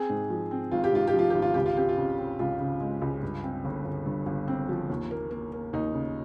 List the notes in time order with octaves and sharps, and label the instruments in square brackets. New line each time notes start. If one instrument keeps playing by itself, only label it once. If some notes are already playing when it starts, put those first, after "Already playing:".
Already playing: [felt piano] C4 [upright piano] G#4
[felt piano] G#2
F3
C4
[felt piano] G#1 [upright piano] F4
[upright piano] G4
[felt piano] G#2 [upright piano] F4
[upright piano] G4
[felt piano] F3 [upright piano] F4
[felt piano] G#1 [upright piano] G4
[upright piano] F4
[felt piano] C#2 [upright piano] G4
[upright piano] F4
[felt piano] C4 [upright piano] G4
[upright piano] F4
[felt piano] C#3
C4
[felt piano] C#2 [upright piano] F4
[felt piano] C#3
G#3
C#2
G2
C4
G1
G1
G2
G1
C4
F3
D#2
A#3
A#3
A#3
[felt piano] D#2 [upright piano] D#4
[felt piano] C#3